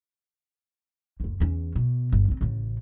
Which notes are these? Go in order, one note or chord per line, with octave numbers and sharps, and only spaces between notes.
F#1 D2
E2 C#4
B2
G1
C#2 C4
A1 C#3